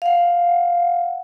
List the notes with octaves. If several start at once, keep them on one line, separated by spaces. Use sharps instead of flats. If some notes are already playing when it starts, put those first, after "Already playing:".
F5 F#5